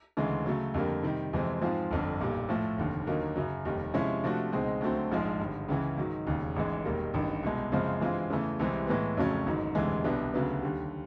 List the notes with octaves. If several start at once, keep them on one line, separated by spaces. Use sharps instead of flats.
D2 C#3 E3 G#3
C#3 F#3 A3
F2 D3 G3 A#3
C3 D#3 G3
F2 C3 E3 G#3 C4
G#2 F3 G#3 C4 F4
G1 F2 D3
B1 A#2 G3
A2 F3 A3
F1 D#2 D3
D#2 D3 F#3 A#3 D#4
F#2 C#3 F#3
F1 D#2 D#3 G3
C3 F3 G#3 C#4 E4
C3 F3 A3 D4 F#4
C#2 B2 G#3 C4 D#4
D2 D3 F#3 A3 C4
A#1 G#2 F3 G#3
G#1 G2 D3
C#2 C#3 E3
G#2 D#3 F#3
E1 D#2 C#3
A1 G#2 E3 G#3
E1 D#2 D#3 G3 A#3
A1 G2 D#3
C2 B2 G#3
F#2 C#3 F3 G#3 C4
G2 E3 G#3 C4 F4
E2 C#3 E3 A3
C2 C3 E3 G#3 C4
A2 E3 G#3 B3
F2 C#3 F#3 A3 C#4
A1 G#2 D#3 F#3
E1 D2 C3 E3 G#3
C2 B2 G3 B3 D4
D2 C#3 F#3 B3
D#2 D3 G3